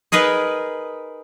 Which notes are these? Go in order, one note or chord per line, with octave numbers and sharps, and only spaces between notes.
D#4 G#4 A#4 B4 D#5